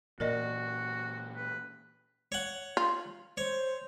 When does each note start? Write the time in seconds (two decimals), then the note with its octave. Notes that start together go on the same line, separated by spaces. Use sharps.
0.20 A#2 E3 F#4 A#4 D5 D#5
1.36 B4
2.32 C#5 F#5
2.77 F4
3.37 C5 C#5